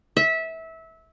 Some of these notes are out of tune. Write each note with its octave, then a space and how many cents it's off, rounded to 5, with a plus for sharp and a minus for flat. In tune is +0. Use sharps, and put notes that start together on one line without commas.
E5 -20